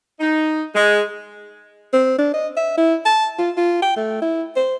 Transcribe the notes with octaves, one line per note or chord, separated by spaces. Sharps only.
D#4
G#3
C4
D4
D#5
E5
E4
A5
F4
F4
G5
A3
E4
C5